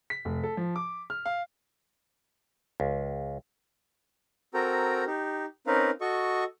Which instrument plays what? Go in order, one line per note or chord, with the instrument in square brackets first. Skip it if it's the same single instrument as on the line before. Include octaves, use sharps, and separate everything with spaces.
[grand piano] B6
F1
A4
F3
D6
F6
F5
[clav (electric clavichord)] C#2
[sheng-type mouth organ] C4 F#4 A4 A#4 G5 A#5
D#4 G4
C4 C#4 D#4 A#4 B4 F5
F#4 A4 D#5 C#6